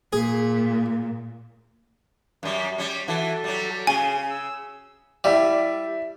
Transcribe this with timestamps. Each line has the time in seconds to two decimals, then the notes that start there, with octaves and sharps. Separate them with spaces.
0.13 A#2 G#4
2.43 F#2 G3
2.78 G3 C#4
3.08 E3 F#4 A4 A5
3.44 F#3 G3
3.87 C#3 C#4 G#4 G#5
4.30 E6
5.24 G3 E4 D5 E5